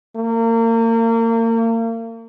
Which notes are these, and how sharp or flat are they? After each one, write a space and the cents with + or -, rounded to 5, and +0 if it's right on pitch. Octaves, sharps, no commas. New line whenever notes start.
A#3 -35